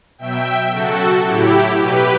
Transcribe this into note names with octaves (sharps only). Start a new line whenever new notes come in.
B2 F#3 E5 G5
C#3 F#3 F#4 A4
A2 F#3 E4 G4
B2 F#3 G4 B4